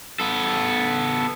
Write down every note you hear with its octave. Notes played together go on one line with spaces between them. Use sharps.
B3 A4